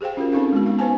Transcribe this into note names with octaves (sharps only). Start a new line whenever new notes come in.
G4 G#4 C5 F5 G5
C#4 F4 F#4 A#4
C4 C#4 D#4 A4 F5
G#3 B3 F#4
F5
B3 D#4 B4 C5 G#5 A5